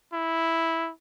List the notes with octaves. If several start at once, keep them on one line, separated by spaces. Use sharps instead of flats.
E4